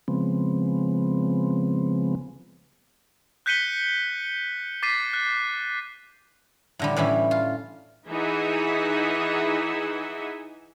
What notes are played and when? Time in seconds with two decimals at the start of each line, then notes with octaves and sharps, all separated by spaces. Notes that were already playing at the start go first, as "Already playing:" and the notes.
0.08 C#3 F3 G#3 B3 C4
3.46 F#6 G6 B6 C#7 D#7 G7
4.83 D6 A6 B6 C7 D#7
5.13 F#6
6.79 A2 D3 G3
6.96 A2 E3 G3 C#4 E4
7.31 F4
8.08 E3 D#4 G#4 E5 F#5